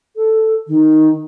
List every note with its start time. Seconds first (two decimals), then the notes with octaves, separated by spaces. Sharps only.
0.16 A4
0.67 D#3